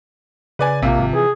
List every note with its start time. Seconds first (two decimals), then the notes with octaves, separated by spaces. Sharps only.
0.59 C#3 B4 D5 G#5
0.82 A#1 C3 F3 A#3
0.98 G#1
1.13 E3 G#4